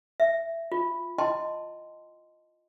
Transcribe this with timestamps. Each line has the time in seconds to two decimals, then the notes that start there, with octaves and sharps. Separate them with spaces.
0.20 E5
0.72 F4
1.18 E4 D#5 G5 A5 C6